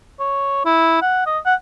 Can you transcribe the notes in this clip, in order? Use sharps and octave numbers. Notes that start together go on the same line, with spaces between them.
C#5
E4
F#5
D#5
F#5